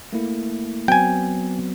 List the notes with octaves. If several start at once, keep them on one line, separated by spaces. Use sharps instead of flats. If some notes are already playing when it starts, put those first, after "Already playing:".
A3 A#3 E4
F#3 B3 C4 G5 G#5